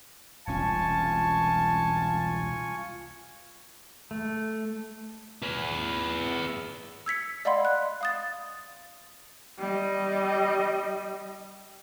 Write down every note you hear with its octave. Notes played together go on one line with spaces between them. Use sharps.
E1 C2 C#4 F4 G#5 A5 C#6
A3
G#4 B4
E6 G#6 B6 C#7
D5 D#5 F5 F#5 B5 C6
F#6
F5 D#6 A6
G3 D#5